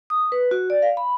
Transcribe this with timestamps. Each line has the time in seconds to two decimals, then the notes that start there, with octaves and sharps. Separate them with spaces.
0.10 D#6
0.32 B4
0.51 F#4
0.70 D5
0.82 F5
0.97 B5